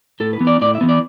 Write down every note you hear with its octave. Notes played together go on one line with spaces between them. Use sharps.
A2 A4
B4
E3 B3
D5
A2 D5
E5
E3 B3
D5